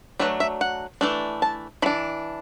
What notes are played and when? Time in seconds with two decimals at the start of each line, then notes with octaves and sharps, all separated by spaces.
0.20 F#3 A3 D4 B4
0.40 E5
0.61 F#5
1.01 E3 A3 D4
1.42 A5
1.82 E3 B5
1.86 D4